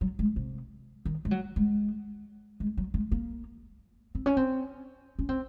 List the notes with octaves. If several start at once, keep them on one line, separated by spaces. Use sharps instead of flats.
F#3
G#3
C3
D#3
G#3
F#3
G#3
G#3
F#3
G#3
A#3
C4
C#4
C4
C#4
C4